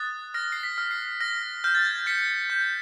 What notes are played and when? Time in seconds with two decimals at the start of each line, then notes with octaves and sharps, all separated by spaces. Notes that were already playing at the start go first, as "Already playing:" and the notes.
Already playing: D#6 F#6 A6
0.34 F6 A#6
0.52 C7
0.63 B6
0.78 F6
0.91 C7
1.21 F6 A#6
1.64 F6 G6
1.75 A6
1.85 G#6
2.06 G6 B6 C#7
2.50 G6